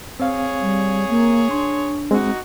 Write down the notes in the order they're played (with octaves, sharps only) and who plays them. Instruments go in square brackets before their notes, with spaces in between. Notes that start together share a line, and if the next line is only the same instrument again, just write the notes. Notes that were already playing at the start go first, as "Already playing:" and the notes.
[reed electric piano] C4 F5 [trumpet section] G#4 C#5
[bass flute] G3
A#3
[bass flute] D4 [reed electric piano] C6
[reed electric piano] G#3 C4 [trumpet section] D#4 F#4